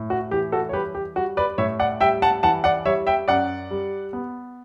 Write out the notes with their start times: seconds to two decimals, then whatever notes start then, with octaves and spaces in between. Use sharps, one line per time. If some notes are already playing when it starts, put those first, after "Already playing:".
Already playing: A2
0.10 F#4
0.31 E3 G4
0.52 F#4 A4
0.69 C#5
0.73 G3 G4 B4
0.95 G4
1.16 G3 F#4
1.37 B4 D5
1.58 A2 C#5 E5
1.79 D5 F#5
2.00 G3 E5 G5
2.22 F#5 A5
2.43 E3 F#5 A5
2.64 D5 F#5
2.86 G3 C#5 E5
3.07 E5 G5
3.28 F#2 D5 F#5
3.71 G3
4.13 B3